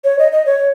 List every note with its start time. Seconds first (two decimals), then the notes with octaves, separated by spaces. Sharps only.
0.04 C#5
0.19 D#5
0.32 D#5
0.46 C#5